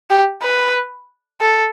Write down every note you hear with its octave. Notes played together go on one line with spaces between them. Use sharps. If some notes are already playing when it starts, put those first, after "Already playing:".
G4
B4
A4